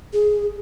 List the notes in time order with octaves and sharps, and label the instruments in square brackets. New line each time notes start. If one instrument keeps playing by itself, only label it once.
[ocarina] G#4